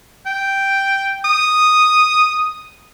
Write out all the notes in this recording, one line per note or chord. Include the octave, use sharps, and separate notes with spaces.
G5
D#6